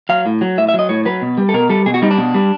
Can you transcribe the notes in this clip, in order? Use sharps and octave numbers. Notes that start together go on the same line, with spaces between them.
F#3 F5
A2
F#3
A2 E5
E5
F#3
D#5
A2 C#5
F#3 B4
B2
G3
A4
B2 A#4
G3 A4
B2 G#4
F#4
G3 D#4
D4
B2
G3